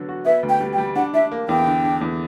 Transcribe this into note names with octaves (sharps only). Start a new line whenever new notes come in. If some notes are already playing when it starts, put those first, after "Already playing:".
Already playing: D3 F#3 B3
F#4
B3 E5
D2
G5
G3
G5
G3
D4 F#5
D4 E5
A#3
E2 G5
D3
D4
E2